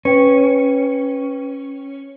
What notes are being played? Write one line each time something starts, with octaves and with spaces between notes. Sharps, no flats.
C#4 B4 G5